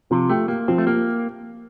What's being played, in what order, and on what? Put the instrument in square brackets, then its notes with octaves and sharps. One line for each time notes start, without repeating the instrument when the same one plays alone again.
[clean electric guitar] C3 [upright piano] F3
[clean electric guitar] A3 [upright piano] G4
[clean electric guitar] A#3 [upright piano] G4
[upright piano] F3 [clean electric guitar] C4
[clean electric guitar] A3
[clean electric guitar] A#3 [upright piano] G4